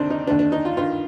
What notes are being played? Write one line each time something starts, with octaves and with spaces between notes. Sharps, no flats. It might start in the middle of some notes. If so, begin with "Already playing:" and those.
Already playing: D2 C3 D#3 C4 D4
D#4
D#2 D3 D4
D4
D#4
F4
G2 D#3 F4